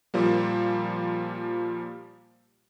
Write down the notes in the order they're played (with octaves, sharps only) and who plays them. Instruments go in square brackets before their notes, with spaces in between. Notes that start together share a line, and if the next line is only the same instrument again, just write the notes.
[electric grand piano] A#2 F3 G3 A#3